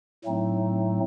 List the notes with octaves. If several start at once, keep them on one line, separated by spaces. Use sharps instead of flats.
A2 F#3 A3 C4 D#4